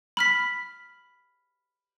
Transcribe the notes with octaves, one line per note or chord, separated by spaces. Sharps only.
B5 F6 B6